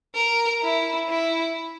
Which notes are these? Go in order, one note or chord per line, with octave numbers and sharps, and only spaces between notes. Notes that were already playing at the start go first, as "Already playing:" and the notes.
A#4
E4
E4